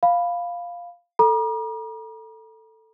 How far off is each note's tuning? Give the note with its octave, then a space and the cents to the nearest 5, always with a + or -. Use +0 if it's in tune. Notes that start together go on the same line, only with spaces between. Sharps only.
F5 +0 B5 +0
A4 +10 A#5 +40 D6 +45